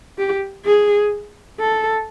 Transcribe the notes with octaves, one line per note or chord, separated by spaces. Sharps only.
G4
G#4
A4